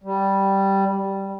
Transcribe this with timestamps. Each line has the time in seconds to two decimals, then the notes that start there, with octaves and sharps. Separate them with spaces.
0.04 G3